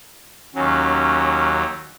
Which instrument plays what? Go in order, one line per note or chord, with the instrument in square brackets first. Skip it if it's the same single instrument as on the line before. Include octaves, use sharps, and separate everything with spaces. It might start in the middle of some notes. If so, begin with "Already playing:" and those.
[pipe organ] D#2 F#3 [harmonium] C#4